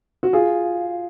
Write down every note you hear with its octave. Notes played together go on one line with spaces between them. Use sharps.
F#4
F4 G#4